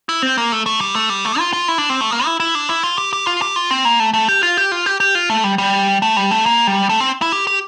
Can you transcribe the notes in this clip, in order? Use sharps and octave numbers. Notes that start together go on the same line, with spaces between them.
E4
C4
A#3
A3
A3
G3
A3
G3
A3
F4
F4
E4
D4
C4
A3
A#3
E4
E4
D4
E4
F4
G4
G4
F4
G4
F4
C4
A#3
A3
A3
G4
F4
G4
F4
G4
G4
F4
A3
G3
G3
A3
G3
A3
A#3
G3
A3
C4
E4
G4
G4